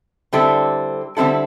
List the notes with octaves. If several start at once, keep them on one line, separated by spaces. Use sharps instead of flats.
D3 G3 C4 E4 A4
D3 G3 C4 E4 A4